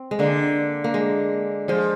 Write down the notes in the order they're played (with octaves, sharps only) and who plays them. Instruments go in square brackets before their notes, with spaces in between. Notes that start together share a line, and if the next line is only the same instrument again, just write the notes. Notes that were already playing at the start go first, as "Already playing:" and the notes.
Already playing: [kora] C4
G#3
[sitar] D3 [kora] A#3
[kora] A#3
G#3
[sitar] F3 [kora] G#3